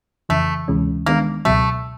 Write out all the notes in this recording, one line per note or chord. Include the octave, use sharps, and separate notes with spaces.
F2 C#3 E3 A3
D2 C3 E3 G#3 C#4
D#3 G#3 A#3 B3 D4
C#2 B2 F#3 A3